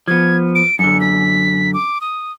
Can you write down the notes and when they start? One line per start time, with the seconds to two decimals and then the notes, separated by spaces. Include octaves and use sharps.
0.08 F3 B3 G#6
0.55 D7
0.79 F#2 D3 C#7
1.01 B6
1.74 D6
2.01 D#6